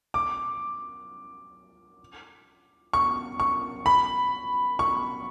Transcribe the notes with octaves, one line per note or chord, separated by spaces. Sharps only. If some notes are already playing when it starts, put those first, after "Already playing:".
D6
C#6
C#6
B5
C#6